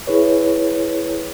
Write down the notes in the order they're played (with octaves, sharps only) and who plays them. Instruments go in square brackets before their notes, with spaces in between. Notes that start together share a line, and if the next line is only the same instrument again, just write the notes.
[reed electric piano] E4 G#4 B4 C#5